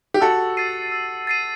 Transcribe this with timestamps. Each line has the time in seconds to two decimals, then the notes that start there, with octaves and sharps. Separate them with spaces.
0.14 G4
0.21 F#4 A4 E6
0.57 A6 C7 D#7
0.92 E6
1.27 A6 C7 D#7